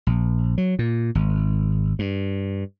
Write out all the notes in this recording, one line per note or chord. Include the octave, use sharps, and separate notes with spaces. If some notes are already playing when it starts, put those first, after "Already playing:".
A#1
F#3
A#2
G#1
G2